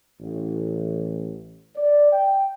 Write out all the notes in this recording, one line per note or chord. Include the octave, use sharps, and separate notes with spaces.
A1
D5
G5